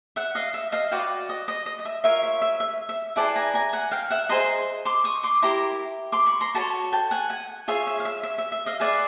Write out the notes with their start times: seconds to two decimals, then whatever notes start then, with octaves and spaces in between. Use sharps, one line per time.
0.16 E5 F#5
0.35 D#5 F5
0.54 E5
0.72 D#5 F5
0.91 F#4 B4 D5 F5 G5
1.29 D#5
1.48 D#5
1.66 D#5
1.79 D#5
1.85 E5
2.04 F4 A#4 C#5 E5
2.23 E5
2.42 E5
2.60 E5
2.89 E5
3.16 E4 G#4 B4 D5 G5 A5
3.36 G#5 A#5
3.54 G#5 A#5
3.73 F#5 G#5
3.91 F5 G5
4.11 E5 F#5
4.29 G#4 C5 D#5 A#5 C6
4.85 C6 D6
5.04 C#6 D#6
5.23 C6 D6
5.42 E4 G4 A#4 A#5 C6
6.12 C6 D6
6.26 B5 C#6
6.41 A#5 C6
6.55 F#4 A4 C#5 A5 B5
6.93 G5 A5
7.11 F#5 G#5
7.30 F#5 G#5
7.68 F4 G#4 C#5 E5
7.87 E5
8.00 F5
8.05 E5
8.23 E5
8.38 E5
8.52 E5
8.66 D#5 F5
8.80 G#4 B4 D5 E5 F#5